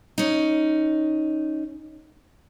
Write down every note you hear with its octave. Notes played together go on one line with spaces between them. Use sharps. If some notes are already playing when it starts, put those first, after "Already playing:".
C#4 D#4